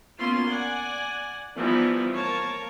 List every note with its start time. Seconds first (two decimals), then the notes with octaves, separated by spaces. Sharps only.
0.19 A#3 B3 C#4 E4 F4 C6
0.49 D5 F#5 G#5
1.56 E3 F3 G3 B3 D#4 E4
2.14 A#3 A#4 C#5 A5